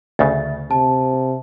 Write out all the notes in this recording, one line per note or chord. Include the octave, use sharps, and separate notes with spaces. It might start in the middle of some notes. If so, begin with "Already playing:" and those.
D2 C#3 E5 A6
C3 A5